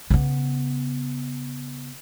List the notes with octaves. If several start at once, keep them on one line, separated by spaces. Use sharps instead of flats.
C#3 B3